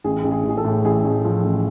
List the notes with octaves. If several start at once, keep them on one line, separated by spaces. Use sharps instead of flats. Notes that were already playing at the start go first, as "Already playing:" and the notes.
A1 G#4
A1
G#4
A1
G#4
A4
A2
A1 G#4
A1
F3
A1